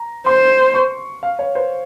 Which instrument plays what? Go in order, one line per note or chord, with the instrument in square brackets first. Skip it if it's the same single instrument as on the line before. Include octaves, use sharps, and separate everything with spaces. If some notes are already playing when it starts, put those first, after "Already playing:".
Already playing: [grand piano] A#5
[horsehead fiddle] C5 [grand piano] C6
[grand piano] C#6
F5
C#5
C5